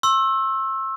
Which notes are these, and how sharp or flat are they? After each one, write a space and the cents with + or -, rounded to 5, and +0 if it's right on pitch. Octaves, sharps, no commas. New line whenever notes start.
C6 +45 E6 +0